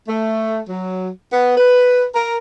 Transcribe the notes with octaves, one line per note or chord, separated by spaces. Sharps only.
A3
F#3
B3
B4
A#4